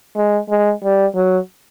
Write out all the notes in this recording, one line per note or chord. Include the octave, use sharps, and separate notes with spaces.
G#3
G#3
G3
F#3